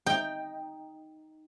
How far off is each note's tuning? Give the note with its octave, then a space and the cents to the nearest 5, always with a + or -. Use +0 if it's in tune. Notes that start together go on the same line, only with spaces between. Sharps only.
D#4 +0 G5 +5